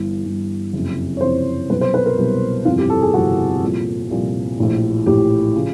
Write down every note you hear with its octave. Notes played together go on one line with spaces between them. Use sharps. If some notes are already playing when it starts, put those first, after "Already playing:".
Already playing: G1 G2 E3
G1 G2 E3
F#1 F2 C3 E3
C#5
F#1 F2 C3 E3 C5
C2 B2 F#3 B4
C5
B4
A#4
C2 B2 F#3
G1 F2 C3 E3 F4
G4
A4
G#4
G1 F2 C3 E3 F#4
C2 A#2 F3
C2 A#2 F3
A#1 A2 E3
A#1 A2 E3 G4
C#3 F3